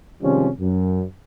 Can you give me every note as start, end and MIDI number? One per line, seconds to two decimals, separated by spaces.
0.22 0.48 48
0.22 0.48 51
0.22 0.48 53
0.22 0.48 55
0.22 0.48 56
0.22 0.48 61
0.60 1.02 42